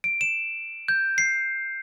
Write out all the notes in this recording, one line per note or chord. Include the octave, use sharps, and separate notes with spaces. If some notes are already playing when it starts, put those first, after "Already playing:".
D7
E7
G6
C7